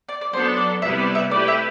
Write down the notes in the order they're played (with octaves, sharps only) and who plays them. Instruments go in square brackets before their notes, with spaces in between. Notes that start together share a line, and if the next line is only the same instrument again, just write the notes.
[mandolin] D5
D5
[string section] F#3 B3 D4 A4 [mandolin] C5
[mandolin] D5
[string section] C3 G3 B3 E4 B4 [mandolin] E5
[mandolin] D5
E5
[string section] A3 E4 G4 B4 [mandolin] D5
[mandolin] E5